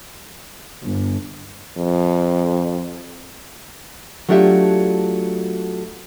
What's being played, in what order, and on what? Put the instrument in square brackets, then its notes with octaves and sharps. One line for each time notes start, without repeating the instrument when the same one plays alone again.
[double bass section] G1
[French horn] F2
[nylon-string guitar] F#3 A3 D4 F4 G4 E5